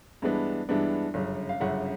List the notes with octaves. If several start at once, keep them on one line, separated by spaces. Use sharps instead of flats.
G2 E3 G#3 B3 D4
G2 E3 G#3 B3 D4
G1 F#2 C#3
F5
G1 F#2 C#3 E5 F#5